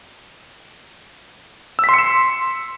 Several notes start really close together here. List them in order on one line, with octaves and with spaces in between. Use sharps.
E6 B6 C6 C#7 E7